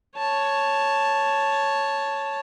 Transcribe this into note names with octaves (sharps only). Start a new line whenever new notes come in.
C#5 A5